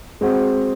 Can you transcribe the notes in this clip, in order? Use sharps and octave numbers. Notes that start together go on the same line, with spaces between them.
G#3 C4 F#4